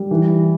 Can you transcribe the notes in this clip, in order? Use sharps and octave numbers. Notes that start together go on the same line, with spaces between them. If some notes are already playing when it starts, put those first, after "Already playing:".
Already playing: G3
E3